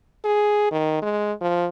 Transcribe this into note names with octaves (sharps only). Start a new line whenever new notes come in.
G#4
D#3
G#3
F3